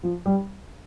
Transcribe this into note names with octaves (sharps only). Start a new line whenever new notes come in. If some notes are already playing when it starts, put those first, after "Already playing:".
F3
G3